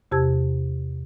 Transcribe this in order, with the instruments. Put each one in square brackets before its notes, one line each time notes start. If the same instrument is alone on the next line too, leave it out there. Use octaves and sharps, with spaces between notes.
[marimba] E2 C3 G4 A5 E6 G#6